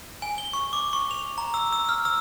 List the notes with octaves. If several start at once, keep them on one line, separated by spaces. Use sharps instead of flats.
G#5
G7
C#6
D6
C#6
F7
A#5
E6
E6
F6
E6